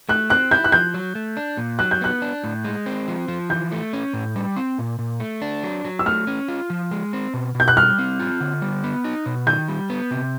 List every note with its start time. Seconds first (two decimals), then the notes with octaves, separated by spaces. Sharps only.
0.09 A3 F#6
0.30 C4 F#6
0.51 E4 G6
0.64 F#6
0.72 F3 G6
0.94 F#3
1.15 A3
1.37 D4
1.57 A#2
1.79 F#3 F#6
1.91 G6
2.01 B3 F#6
2.22 D4
2.44 A2
2.65 G#3
2.86 C4
3.08 F3
3.28 F3
3.50 E3 G6
3.72 A3
3.93 C#4
4.13 A2
4.36 G3
4.57 C4
4.79 A#2
4.99 A#2
5.20 A3
5.42 D4
5.63 F#3
5.85 F#3
5.99 E6
6.06 A3 F6
6.27 C#4
6.48 F4
6.70 F3
6.91 G#3
7.13 C4
7.34 B2
7.55 B2
7.60 G6
7.68 F#6
7.76 G3 F6
7.98 C4
8.20 F4
8.40 D3
8.62 G3
8.84 B3
9.04 D#4
9.26 B2
9.47 D#3 G6
9.68 G3
9.90 B3
10.11 C3